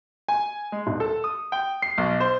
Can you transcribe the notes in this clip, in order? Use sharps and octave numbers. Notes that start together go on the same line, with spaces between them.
G#5
G#3
D#1
A4
D#6
G5
C7
B1
C5